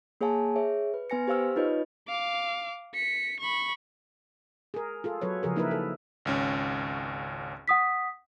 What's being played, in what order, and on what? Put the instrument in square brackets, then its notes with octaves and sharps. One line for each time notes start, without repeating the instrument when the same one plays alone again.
[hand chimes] A#3 G#4 C#5 F5 G#5 A5
G#4 C#5 E5
B4
B3 B4 G#5 A#6 C#7
G4 C5 F5 E6 F6
D#4 F4 B4 C#5 D#5
[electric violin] F5 D6
B6 C#7
B5 C#6
[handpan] G#4 A#4
F4 G#4 A4
F#3 A4 B4 C#5
C#3 F3 G#4 A#4
A#3 D#4 E4 A#4 B4 E5
A4
[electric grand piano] G#1 C#2 C#4
[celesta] F#5 D#6 B6